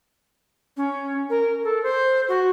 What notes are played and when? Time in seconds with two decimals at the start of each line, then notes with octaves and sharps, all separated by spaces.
0.77 C#4
1.30 A#4
1.64 A4
1.83 C5
2.28 F#4